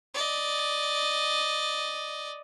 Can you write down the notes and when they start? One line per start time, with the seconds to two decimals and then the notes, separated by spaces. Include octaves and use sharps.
0.14 D5 D#5